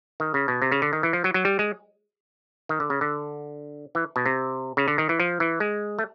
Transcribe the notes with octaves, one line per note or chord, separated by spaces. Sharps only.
D#3
C#3
B2
C3
C#3
D3
D#3
E3
F3
F#3
F#3
G3
G#3
D#3
D3
C#3
D3
E3
B2
C3
C#3
D3
D#3
E3
F3
E3
G#3
A3